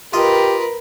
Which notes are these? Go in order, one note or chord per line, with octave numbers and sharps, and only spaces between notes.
F4 G4 A#4 B4 D#5